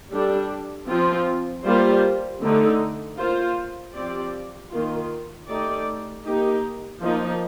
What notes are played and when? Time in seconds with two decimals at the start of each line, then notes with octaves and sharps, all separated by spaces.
0.12 G3 D4 A4
0.88 F3 C4 F4
1.65 G3 A#3 F4 C5
2.41 D3 A3 D#4
3.18 A#3 F4 C5
3.95 F3 C4 G4 D5
4.72 D#3 A#3 F4
5.49 A3 D#4 G4 D5
6.25 A#3 D#4 G4
7.02 F3 A#3 D#4